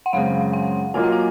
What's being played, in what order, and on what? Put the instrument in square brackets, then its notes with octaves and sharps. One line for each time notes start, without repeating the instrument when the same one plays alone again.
[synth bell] F#5
[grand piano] F#2 C#3 G#3 C4 [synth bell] F5
[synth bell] F#5
[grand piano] F#3 A#3 F4 A#4 D#5 [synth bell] G#5
[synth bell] F#5
G#5